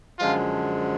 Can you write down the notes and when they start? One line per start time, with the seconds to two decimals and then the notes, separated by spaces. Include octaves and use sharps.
0.19 F#2 D3 F3 G#3 F4 F5